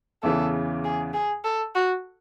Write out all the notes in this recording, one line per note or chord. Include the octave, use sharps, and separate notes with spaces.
E2 C#3 E3 A4
G#4
G#4
A4
F#4